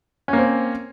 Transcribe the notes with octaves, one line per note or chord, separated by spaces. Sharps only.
A#3 C4 C#4